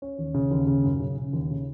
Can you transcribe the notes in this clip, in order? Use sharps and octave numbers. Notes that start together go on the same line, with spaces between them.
C#4
D#2
C#3
D#2
C#3
F#2
C#3
C#3
D#2
C#3